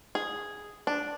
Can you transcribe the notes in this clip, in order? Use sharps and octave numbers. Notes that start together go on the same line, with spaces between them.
G#4
D4